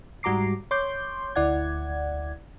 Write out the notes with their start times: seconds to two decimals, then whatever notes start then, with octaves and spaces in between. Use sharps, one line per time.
0.23 G#2 G3 F#4 A#5 D6 C7
0.71 C#5 C6 D6 G6
1.35 D2 E4 D5 F#5 G#6